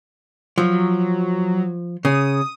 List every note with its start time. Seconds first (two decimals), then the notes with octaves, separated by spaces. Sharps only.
0.58 F3 F#3
2.05 C#3 D#6